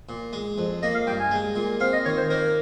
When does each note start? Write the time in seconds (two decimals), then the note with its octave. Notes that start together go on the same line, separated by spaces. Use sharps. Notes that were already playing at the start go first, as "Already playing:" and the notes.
0.09 A#2
0.33 G#3
0.58 F2
0.82 A#3 D#5
0.95 F5
1.07 G2 G5
1.19 G#5
1.31 G#3
1.56 A#2
1.80 C4 F5
1.93 D#5
2.05 D#3 C#5
2.17 C5
2.30 A#3 A#4